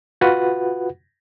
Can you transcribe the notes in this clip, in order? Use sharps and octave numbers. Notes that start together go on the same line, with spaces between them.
F4 F#4 B4 F#5